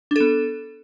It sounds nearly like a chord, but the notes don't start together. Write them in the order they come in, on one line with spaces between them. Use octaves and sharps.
D4 A4 B3